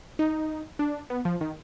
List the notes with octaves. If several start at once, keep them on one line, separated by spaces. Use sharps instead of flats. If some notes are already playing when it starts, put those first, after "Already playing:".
D#4
D4
B3
F3
D#3